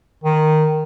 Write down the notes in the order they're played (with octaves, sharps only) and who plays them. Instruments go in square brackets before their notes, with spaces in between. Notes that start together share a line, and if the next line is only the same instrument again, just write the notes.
[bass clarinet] D#3